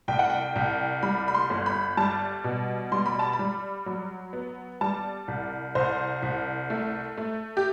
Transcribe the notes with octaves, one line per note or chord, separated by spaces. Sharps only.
C2 G5
F#5
G5
C2
G3 B5
B5
C6
G1
B5
G3 A5
B2
G3 C6
B5
A5
B5
G3
F#3
B3
G3 A5
C2
C2 C5
C2
A3
A3
G4